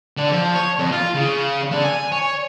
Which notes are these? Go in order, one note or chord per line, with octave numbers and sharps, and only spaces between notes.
D3
F3
C#5
F2
F4
C#3
D3
G#5
C#5